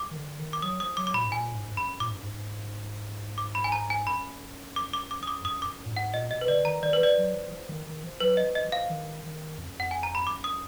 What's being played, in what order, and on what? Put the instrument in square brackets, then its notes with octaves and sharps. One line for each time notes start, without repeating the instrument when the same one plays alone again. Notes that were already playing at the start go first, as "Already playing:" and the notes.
Already playing: [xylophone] D6
[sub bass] D#3
D3
D#3
[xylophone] D6
[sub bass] F#3 [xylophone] D#6
[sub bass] F3 [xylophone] D#6
[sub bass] F#3 [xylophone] D6
[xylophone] D6
[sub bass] A#2 [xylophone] B5
[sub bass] G#2
[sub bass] A#2 [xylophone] G#5
[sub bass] G#2
G#2
[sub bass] F#2 [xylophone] B5
[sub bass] A#2 [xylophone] D6
[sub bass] G#2
F#2
G#2
G#2
[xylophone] D6
B5
G#5
A#5
G#5
[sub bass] F#2 [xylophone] B5
[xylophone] D6
D6
D6
D#6
D6
[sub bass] F#2 [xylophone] D#6
[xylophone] D6
[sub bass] F#2
A#2
G#2
[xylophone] F#5
[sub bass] A#2 [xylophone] D#5
[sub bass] B2 [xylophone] D#5
[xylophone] B4
[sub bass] D3 [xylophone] D5
[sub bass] D#3 [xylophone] A#5
[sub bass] D#3 [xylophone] D5
[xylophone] B4
[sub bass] F3 [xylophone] D5
[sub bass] F#3
F3
F3
D#3
D#3
F3
[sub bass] F#3 [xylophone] B4
[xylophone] D#5
[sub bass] F3
[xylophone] D#5
[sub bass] F3
[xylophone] F5
[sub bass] D#3
D#3
F2
F#2
[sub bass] F2 [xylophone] F#5
[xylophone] G#5
A#5
B5
[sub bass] F#2 [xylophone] D6
[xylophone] D#6